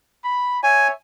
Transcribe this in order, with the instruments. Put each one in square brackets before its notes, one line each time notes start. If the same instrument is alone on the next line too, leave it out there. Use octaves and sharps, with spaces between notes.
[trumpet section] B5
[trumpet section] C#5 E5 [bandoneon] G#5